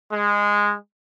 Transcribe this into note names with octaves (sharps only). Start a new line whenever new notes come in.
G#3